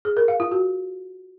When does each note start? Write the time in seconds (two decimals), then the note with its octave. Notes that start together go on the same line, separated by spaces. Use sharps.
0.05 G#4
0.17 A#4
0.28 F5
0.40 F4
0.51 F#4